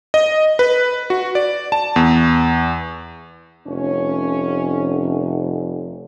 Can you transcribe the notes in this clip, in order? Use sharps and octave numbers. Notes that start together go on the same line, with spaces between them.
D#5
B4
F#4
D5
A5
E2
F1 C#4